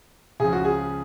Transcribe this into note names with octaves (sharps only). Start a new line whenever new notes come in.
C#2 C#3 F3 G#4
F#4
G#4